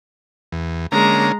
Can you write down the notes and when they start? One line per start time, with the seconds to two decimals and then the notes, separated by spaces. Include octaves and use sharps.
0.52 E2
0.92 D3 G#3 A#3 C#4 A#5